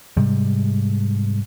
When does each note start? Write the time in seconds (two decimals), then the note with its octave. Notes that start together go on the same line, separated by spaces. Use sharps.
0.17 G#2 C3 G3 G#3